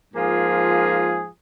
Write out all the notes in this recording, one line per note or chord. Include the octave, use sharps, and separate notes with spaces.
G#2 F3 A#3 F4 G#4